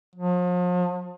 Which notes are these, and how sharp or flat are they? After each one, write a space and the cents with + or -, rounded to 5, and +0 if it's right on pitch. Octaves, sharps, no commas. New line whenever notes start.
F3 +40